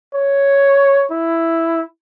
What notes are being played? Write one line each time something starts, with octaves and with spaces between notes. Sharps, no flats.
C#5
E4